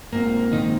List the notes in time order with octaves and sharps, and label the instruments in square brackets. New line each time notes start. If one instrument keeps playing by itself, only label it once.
[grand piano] A#1 G#2 F3 C4 [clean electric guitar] A#3
[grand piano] A#1 G#2 F3 C4 [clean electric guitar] D#3 D#4